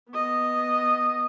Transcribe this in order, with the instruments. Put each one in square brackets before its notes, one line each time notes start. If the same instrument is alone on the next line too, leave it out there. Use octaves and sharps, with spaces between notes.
[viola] B3 D#5